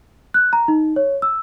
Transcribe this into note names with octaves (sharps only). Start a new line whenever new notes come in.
F#6
A#5
D#4
C#5
E6